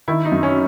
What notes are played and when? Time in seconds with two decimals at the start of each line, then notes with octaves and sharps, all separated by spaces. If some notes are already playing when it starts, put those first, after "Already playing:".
0.08 D#3 E4
0.25 D#4
0.32 F#2
0.43 C#4